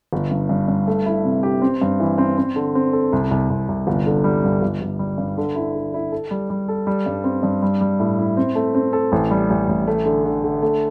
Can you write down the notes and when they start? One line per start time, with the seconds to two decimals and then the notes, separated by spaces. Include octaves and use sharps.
0.13 G1
0.31 G2
0.49 G2
0.68 G2
0.87 A3
1.06 E4
1.24 C3
1.43 G4
1.62 C4
1.82 G2
2.00 E3
2.18 C4
2.38 C4
2.56 D3
2.75 C4
2.93 A4
3.13 C2
3.31 C2
3.50 C2
3.68 C2
3.87 G1
4.06 D3
4.24 G3
4.44 G2
4.62 G1
4.81 G1
4.99 G3
5.18 G2
5.38 D3
5.56 E4
5.75 D3
5.94 E4
6.12 A4
6.31 G3
6.50 G3
6.68 A4
6.87 G3
7.06 G2
7.24 C4
7.43 G2
7.62 G3
7.81 G3
8.00 A2
8.19 E4
8.37 C4
8.55 A3
8.75 C4
8.93 A4
9.12 A1
9.31 G3
9.50 A1
9.69 A1
9.87 A3
10.06 D3
10.25 D3
10.44 D3
10.62 A3